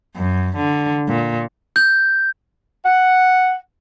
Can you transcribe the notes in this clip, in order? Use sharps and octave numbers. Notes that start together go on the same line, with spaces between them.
F#2
D3
A#2
G6
F#5